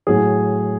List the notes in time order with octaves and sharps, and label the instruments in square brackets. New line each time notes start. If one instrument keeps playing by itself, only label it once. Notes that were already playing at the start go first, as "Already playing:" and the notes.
[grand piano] A2 F#3 G#4